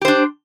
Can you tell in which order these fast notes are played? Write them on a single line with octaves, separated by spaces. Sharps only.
G4 C5 D4